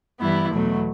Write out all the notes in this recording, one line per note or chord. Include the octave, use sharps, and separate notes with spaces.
G2 E3 G3 B3 E4
E2 B2 F#3 A3